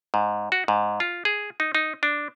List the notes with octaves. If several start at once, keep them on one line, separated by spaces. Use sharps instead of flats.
G#2
F#4
G#2
F4
G#4
D#4
D#4
D4